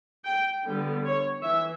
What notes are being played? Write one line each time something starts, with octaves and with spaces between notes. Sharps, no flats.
G5
D3 G3 B3
C#5
E3 E5